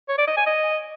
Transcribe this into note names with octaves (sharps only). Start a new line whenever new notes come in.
C#5
D5
D#5
G#5
D#5